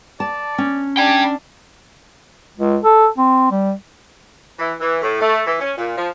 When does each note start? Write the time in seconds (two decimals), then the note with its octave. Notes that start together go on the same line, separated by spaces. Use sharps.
0.20 D5 A5
0.58 C#4
0.97 D4 D5 G5 G#5
2.57 C#2
2.84 A4
3.17 C4
3.51 G3
4.59 E3
4.80 E3
5.02 A2
5.20 A3
5.46 E3
5.60 C#4
5.77 A#2
5.96 F3